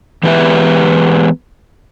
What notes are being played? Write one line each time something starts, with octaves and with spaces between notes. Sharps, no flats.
E3 G#3 B3 G4 B4 E5